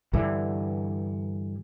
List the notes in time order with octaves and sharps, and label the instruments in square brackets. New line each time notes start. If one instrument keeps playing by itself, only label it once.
[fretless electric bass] G2 D3 E3